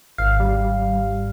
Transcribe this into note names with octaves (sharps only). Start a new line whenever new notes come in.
G#1 F5
G3